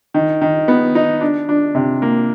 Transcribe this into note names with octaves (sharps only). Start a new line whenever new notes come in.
D#3
D#3
B3
D#4
D4
D4
C3
A#3